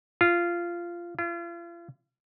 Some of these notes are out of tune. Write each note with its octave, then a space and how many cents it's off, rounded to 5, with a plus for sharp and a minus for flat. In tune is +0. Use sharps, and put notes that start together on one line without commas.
F4 -15
F4 -40